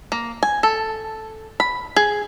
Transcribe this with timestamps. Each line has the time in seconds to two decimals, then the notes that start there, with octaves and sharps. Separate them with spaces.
0.12 A#3
0.43 G#5
0.63 A4
1.60 B5
1.96 G#4